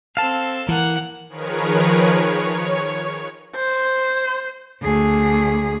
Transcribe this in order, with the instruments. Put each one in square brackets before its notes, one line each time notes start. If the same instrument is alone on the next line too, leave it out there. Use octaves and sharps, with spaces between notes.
[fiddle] C4 A4 [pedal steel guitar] F5 A5
[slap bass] E3 [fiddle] A#3 F#5
[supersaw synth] D#3 F3 G#4 A#4 B4 C#5
C#5
[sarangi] C5
[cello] D2 G#4